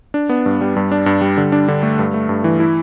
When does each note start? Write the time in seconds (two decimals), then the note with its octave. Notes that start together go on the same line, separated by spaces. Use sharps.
0.14 D4
0.29 B3
0.46 G2
0.61 G3
0.76 G2
0.92 D4
1.06 G2
1.21 G3
1.37 D3
1.52 D4
1.68 D3
1.83 A3
1.99 G2
2.14 A3
2.29 G2
2.44 E3
2.60 E4